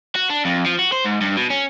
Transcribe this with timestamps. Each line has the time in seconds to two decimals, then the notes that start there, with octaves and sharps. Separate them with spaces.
0.15 F#4
0.30 D4
0.45 F2
0.66 F3
0.79 F#4
0.92 C5
1.05 G#2
1.21 G2
1.37 B2
1.51 C#4